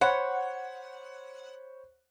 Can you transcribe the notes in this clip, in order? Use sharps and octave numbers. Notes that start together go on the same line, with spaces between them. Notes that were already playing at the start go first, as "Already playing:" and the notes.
C5 C#5 F#5 B5